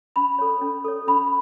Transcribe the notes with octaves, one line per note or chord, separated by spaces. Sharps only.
C#4 B5
A4 C#5
C#4
A4 C#5
C#4 B5